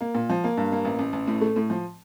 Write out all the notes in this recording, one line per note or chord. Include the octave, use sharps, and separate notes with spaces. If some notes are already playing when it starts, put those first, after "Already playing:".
A#3
A#2
F3
A#3
G2
A#3
A1
A1
A1
A2
A3
A2
F3